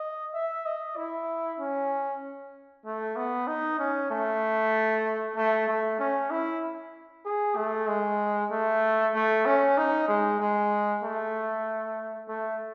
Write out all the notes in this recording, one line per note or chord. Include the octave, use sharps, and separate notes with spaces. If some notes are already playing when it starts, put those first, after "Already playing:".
Already playing: D#5
E5
D#5
E4
C#4
A3
B3
D#4
C#4
A3
A3
A3
C#4
E4
G#4
A3
G#3
A3
A3
C#4
D#4
G#3
G#3
A3
A3